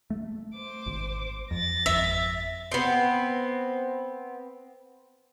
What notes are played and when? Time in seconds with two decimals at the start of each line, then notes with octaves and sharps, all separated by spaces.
0.10 A3
0.55 C5 D6
0.86 G#1
1.51 F2 A6 A#6
1.86 G#1 F2 E5
2.72 B3 C4